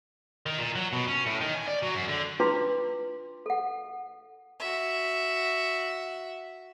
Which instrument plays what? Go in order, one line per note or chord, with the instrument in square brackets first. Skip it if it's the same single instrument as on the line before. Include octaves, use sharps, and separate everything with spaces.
[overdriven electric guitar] D#3
A#2
F#3
B2
C#4
A2
D#3
G#5
D5
F#3
F#2
D3
[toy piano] D4 E4 F4 B4 C6 D6
A4 F#5
[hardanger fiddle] F#4 E5